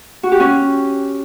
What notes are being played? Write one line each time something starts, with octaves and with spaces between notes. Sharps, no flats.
F#4
G4
C#4